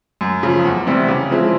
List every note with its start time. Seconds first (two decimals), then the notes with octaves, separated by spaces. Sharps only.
0.21 F#2
0.43 C#3 F3
0.65 E2
0.87 C3 E3 G3 C4
1.08 C#3
1.31 F3 G#3 C4 E4